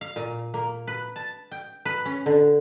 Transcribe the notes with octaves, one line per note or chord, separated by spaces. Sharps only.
F5
A#2
A#3
B4
A5
G5
B4
C#4
D3